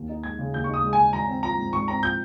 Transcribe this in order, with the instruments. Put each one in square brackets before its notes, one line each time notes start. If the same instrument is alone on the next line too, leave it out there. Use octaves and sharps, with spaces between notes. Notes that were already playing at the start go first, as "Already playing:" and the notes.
Already playing: [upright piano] D#2
D#4
[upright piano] G#3 [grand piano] G#6
[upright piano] C#3
[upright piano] D#2 [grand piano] G6
[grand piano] C#6
[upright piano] D#4 [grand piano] D#6
[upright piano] G#3
[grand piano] G#5
[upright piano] C#3
[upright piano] G#1 [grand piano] A#5
[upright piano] C4
[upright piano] F3 [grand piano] A#5
[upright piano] G#2
[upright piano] G#1 [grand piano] C#6
[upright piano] C4 [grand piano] A#5
[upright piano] F3 [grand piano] G6